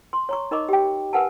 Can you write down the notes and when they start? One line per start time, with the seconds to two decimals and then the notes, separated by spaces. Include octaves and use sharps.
0.13 C6
0.29 C#5 A#5 C#6
0.51 D#4 A#4 D#5 B5 C#6 D6
0.69 G4 G5
1.13 A#4 B4 F#5 G#5 A5